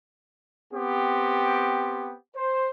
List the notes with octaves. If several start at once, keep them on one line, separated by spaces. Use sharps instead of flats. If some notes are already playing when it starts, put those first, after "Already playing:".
B3 C4 G4
C5